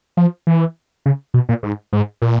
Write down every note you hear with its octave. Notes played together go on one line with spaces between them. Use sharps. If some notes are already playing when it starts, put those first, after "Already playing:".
F3
E3
C#3
B2
A#2
G#2
G#2
A#2